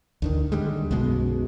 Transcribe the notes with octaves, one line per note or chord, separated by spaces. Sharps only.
D2 D3 D#3
D#2 D3 G3 G#3
B1 F#2 B2 G#3